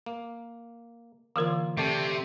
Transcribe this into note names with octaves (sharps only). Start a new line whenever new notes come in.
A#3
D3 E3 A#3 F4 A#4
C3 A3 D5 A5